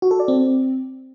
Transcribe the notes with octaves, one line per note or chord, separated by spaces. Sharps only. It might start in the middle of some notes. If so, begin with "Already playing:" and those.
F#4
A4
D5
C4